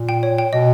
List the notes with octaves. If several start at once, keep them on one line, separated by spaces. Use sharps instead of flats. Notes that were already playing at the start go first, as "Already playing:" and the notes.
Already playing: A#2
G5
C#5
G5
B2 D#5